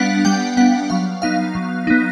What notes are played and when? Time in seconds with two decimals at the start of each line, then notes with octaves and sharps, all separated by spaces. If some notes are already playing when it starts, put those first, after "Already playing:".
Already playing: G3 B3 D4 F5 F#5
0.25 G3 G5
0.57 B3 D4 F#5
0.90 F#3 F5
1.22 B3 D#4 F5
1.55 F#3
1.87 B3 D#4